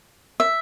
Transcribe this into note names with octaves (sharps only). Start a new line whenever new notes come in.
E5